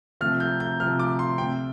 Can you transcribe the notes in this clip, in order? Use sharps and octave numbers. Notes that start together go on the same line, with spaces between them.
C3 F3 A3 F6
G6
G6
C3 F3 A3 F6
D6
C6
C3 A3 G5